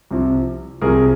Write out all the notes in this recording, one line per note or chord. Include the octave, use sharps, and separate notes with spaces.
C2 C3 F3
C2 C3 F3 G#4 A#4